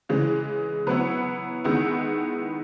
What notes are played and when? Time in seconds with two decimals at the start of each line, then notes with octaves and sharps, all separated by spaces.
0.09 C#3 E3 G#3
0.87 F#3 B3 E4 B4
1.64 D#3 G#3 B3 E4